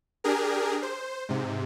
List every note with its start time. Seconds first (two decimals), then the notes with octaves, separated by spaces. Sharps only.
0.24 D4 G4 G#4 A#4
0.82 C5
1.29 G#2 C3